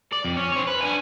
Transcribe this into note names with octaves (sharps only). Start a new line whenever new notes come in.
D5
F2
C#4
C4 C#5
B4
D4 G#5